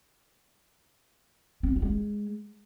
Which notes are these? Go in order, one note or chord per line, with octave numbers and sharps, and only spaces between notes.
C4
F3
G3
G#3